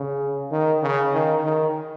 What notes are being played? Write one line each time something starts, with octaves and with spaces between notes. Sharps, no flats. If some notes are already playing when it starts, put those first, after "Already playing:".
Already playing: C#3
D#3
C#3
D#3
D#3